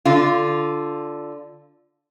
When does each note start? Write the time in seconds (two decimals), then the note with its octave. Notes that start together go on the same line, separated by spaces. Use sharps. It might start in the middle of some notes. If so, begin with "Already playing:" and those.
0.05 D3 F4